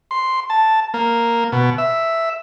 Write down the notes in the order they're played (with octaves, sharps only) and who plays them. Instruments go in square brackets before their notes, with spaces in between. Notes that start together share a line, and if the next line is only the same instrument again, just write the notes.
[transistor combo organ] C6
A5
A#3
B2
E5